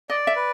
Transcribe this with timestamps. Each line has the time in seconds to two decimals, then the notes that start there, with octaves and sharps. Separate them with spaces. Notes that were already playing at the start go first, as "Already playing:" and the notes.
0.10 D5 D#5
0.27 E5
0.36 B4